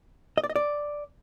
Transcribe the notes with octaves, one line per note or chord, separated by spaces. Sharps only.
D#5
D5
D#5
D5